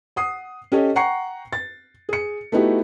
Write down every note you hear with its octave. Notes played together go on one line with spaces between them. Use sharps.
F#5 D#6 C7
C#4 G4 A4 C#5 D#5
F#5 G5 A#5 C#6 C7 C#7
A6
G#4 C#7
A3 B3 D#4 E4 F#4 G4